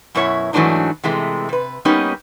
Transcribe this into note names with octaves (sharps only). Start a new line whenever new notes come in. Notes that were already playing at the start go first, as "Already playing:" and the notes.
F#2 B2 E4 C#5 E5
G#2 E3 F#3 A3 D4 D#4
C3 E3 G#3 A3
C3 B4
G3 A#3 B3 C#4 D#4 G4